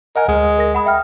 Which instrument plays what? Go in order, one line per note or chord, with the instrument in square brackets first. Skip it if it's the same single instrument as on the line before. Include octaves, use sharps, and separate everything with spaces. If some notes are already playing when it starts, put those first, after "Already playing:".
[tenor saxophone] A#4 [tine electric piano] D#5 F#5 G#5
[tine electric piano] D2 [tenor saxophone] G#3
[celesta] A#4 A#6
F#5 B5 D#6
E5 G5 F6